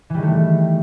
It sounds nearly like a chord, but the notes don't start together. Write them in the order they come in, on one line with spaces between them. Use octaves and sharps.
E3 G3 D#3 A3